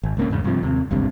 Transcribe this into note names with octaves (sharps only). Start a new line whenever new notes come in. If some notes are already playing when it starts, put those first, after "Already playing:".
G#1
C#2 A#3 C#4
E2 G#2 C#3
G2 C3 F3
D#2 C3
G#1 C#2 G2 C3